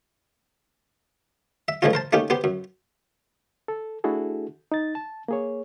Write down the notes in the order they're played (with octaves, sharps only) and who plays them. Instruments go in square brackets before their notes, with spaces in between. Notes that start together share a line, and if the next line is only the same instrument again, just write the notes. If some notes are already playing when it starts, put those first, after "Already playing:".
[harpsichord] E5
A2 E3 F3 G#3 C#4 F4
A#4 C5 A5
A3 A#3 C#4 D#4 G4
B3 G4 C5
F#2
[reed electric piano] A4
A3 D4 E4 F#4 G#4 A4
D#4 A6
A5
A#3 G#4 C#5